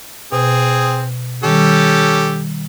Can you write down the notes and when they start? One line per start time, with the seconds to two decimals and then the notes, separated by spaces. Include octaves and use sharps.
0.32 B2 C4 G#4
1.44 D#3 G3 C#4 G4 A4